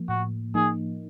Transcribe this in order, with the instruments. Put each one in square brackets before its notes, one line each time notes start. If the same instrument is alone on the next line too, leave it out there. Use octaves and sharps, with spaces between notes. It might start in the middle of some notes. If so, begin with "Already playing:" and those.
Already playing: [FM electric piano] F3 A#3
[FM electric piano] A2 [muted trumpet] F#4
[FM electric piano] F3 A#3 D#4 [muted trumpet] G#4